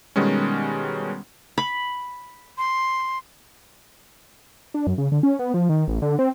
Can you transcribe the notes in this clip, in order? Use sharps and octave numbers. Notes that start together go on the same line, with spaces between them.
B2 D#3 G3 G#3 B3 C#4
B5
C6
D4
F#2
C#3
D3
C#4
B3
F3
D#3
A1
D3
C4